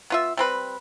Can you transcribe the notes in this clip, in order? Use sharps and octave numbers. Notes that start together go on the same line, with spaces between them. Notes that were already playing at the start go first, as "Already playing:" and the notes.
B3 F4 E5
G3 C4 B4